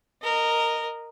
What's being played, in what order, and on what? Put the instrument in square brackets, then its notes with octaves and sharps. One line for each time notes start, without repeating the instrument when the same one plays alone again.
[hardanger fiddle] A#4 D#5